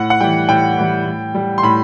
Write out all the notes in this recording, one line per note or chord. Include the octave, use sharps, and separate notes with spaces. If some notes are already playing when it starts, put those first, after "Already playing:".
Already playing: A2 F#5
F#5
E3 G3 G5
A2 G5
E3 G3
A2
G3
C6
A2 B5